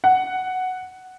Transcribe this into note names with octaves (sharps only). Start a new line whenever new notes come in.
F#5